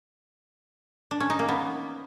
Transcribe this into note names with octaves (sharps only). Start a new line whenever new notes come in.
D4
C#4
D#4
A#3
B3